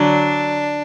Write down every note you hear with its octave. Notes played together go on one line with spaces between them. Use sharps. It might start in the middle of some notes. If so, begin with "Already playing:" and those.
Already playing: D3 F#3 D4